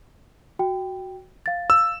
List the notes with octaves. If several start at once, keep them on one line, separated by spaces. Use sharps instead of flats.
F#4 G5
F5 A6
E6